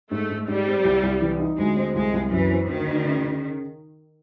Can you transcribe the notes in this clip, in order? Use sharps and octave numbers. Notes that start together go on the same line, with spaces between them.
G#2 A3
G#2
G#2 G3
C4
C2
C2
E3
D#4
D2 G#3
C4
C2 G#3
C2
F#2 E3
C4
D2 D#3
D2
C#3
C#3